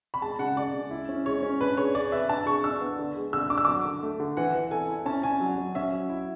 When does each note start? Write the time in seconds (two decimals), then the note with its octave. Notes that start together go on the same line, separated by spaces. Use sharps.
0.14 B5
0.22 G#3 A5
0.39 C#3 F#5
0.57 G#3 D5
0.74 C#3
0.91 E4
1.09 C#4
1.26 G#3 C#5
1.43 C#4
1.61 D4 B4
1.77 G#4 C#5
1.95 G#4 D5
2.12 B4 E5
2.29 D4 A5
2.46 G#4 C#6
2.64 D4 E6
2.81 B3
2.99 D3
3.16 G#3
3.33 D3 E6
3.50 D4 D6
3.58 E6
3.65 F#3 D6
3.85 D3
4.03 A3
4.20 D3
4.37 E3 F#5
4.55 E3
4.71 A4 G#5
4.88 E4
5.06 C#4 A5
5.23 C#4 G#5
5.40 F#3
5.58 F#3
5.75 C#4 E5
5.92 F#3
6.09 E4